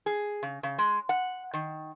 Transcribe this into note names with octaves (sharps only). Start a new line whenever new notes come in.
G#4
C#3
C#3
G#3
F#5
D#3